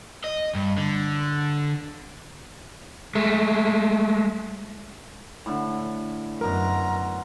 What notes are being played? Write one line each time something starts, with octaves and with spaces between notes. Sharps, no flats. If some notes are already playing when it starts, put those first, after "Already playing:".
D#5
G2
D3
G#3 A3
A2 D3
F#2 B2 A#4 A#5 C6